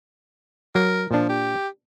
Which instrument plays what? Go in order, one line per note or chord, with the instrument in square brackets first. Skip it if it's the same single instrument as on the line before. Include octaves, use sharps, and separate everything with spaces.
[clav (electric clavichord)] F#3 [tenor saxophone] A#4
[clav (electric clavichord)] A#2 D4 [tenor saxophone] F3
[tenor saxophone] G4